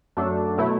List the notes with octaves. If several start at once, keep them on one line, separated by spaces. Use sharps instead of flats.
F#2 F#3 A3 D4 A4
B2 F#3 A3 E4